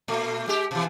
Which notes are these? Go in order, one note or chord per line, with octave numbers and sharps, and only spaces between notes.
A#2 A3
G#3 G4
B2 E3